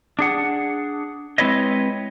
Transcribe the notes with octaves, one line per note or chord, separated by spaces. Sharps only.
D4 G#4 F#5
G#3 C4 E4 B4 C#5 D#5